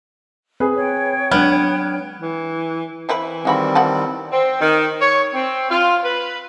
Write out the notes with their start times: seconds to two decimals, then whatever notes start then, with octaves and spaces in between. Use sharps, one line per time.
0.60 C4 G#4 B4
0.77 C#5 G5
1.31 F#3 G#3 B3 D4 F6 F#6
2.20 E3
3.09 E3 C4 E4 B4
3.45 D#3 G3 G#3 C4 F#4 B5
3.75 D#4 F#5 A5
4.32 C4
4.61 D#3
5.01 C#5
5.34 C4
5.70 F4
6.03 B4